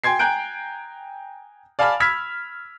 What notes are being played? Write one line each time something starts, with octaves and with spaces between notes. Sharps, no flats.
G5 G#5 C6 G#6 C7
G5 G#5 A#5 F#6 G6 D7
D5 F5 G#5 A5 B5 F6
B5 E6 F6 G#6 B6